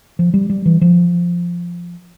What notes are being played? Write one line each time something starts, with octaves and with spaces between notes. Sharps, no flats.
F3
G3
G3
E3
F3